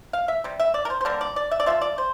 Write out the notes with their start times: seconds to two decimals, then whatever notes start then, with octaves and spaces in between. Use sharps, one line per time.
0.13 F5
0.28 E5
0.44 C3 G3
0.60 E5
0.74 D5
0.85 A#4
0.90 C5
1.01 C5
1.05 D3 G3 A#3 D4 A#4
1.21 D5
1.36 D5
1.51 E5
1.60 D5
1.66 F3 C4 F4 E5
1.81 D5
1.98 C5